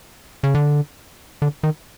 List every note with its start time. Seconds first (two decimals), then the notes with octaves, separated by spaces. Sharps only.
0.43 C#3
0.55 D3
1.42 D3
1.63 D#3